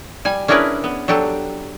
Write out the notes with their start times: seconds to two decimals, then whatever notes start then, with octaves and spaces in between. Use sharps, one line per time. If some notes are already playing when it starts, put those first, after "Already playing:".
0.25 G3 G#5
0.48 C#4 D4 E4 G#4 A#4 B4
0.84 B3
1.08 F#3 D4 G4 A4